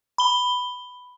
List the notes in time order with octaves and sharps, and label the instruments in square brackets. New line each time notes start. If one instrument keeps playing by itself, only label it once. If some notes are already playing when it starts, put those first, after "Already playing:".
[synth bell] B5 G7